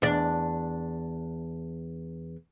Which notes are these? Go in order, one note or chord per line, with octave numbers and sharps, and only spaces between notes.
E2 D4